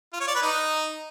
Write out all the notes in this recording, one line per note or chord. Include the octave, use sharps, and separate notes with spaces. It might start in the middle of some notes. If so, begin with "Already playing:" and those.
F4
C#5
D5
B4
D#4